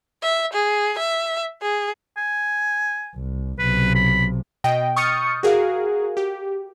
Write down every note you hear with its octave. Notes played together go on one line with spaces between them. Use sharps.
E5
G#4
E5
G#4
G#5
C2
B1 C3 B4
B5
B2 D#5 G5
C#6 D#6 F6 G6 A6 C#7
F#4 G#4 A#4 F5
G4